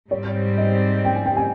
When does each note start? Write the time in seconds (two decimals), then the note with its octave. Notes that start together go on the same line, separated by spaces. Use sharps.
0.11 G#2 G3 C4 C#5
0.58 D#5
1.05 G5
1.16 G#5
1.26 G5
1.37 G#5